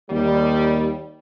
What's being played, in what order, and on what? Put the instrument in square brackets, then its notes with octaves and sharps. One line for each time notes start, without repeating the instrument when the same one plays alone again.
[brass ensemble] D#2 G3